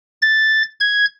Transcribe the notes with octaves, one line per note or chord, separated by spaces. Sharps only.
A6
G#6